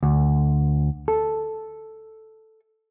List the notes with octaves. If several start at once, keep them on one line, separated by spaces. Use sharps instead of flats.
D2
A4